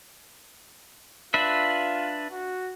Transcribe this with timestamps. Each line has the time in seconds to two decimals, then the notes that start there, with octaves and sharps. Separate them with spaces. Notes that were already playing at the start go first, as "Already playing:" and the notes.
1.34 D4 F4 B4 E5
2.32 F#4